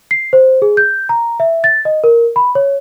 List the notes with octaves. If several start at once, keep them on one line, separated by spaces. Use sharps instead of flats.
C7
C5
G#4
G6
A#5
E5
A6
D#5
A#4
B5
C#5